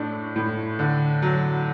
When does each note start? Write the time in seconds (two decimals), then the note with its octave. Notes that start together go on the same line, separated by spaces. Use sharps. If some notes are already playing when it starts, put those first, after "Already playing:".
Already playing: A2 A3 D4
0.36 A2
0.79 D3
1.22 F#3